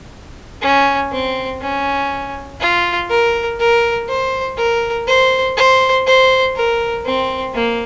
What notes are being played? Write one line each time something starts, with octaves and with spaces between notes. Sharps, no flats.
C#4
C4
C#4
F4
A#4
A#4
C5
A#4
C5
C5
C5
A#4
C4
A#3